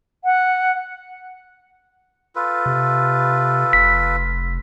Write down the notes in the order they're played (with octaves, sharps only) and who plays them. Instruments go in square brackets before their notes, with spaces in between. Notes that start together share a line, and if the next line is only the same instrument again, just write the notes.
[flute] F#5
[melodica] F4 A4 B4
[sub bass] C3
[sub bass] F1 [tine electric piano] B6